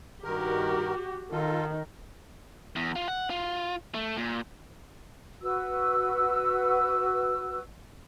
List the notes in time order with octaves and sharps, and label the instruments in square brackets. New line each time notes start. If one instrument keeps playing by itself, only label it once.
[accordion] G2 D#3 A#4 [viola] F#4 G4
[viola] D#3 [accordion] F4 A4
[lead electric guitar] E2
F4
F#5
F4
A3
A#2
[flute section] F#4 B4 E6